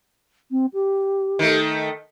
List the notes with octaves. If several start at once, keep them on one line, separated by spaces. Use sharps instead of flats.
C4
G4
D#3 A3